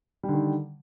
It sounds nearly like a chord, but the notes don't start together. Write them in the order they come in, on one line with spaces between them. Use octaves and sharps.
G3 D3 D#3